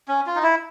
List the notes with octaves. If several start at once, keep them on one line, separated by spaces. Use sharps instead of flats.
C#4
F4
D#4
E4